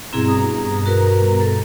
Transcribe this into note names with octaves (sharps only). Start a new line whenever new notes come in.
G2 B2 C4 E4 G#4 A#5
G#4 D#6
F#4 A#4 B4
A4